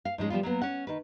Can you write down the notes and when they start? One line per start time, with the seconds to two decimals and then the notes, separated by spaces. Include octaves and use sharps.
0.05 F5
0.18 G#2 F3 G#3 C#4
0.30 F3 G3 B3 F4
0.43 F#3 A#3 B3
0.62 C#4 F#5
0.87 D#3 B4